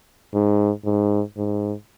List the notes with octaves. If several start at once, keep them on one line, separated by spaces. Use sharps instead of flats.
G#2
G#2
G#2